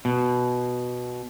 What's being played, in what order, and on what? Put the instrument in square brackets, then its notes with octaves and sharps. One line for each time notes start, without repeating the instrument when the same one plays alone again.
[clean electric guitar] B2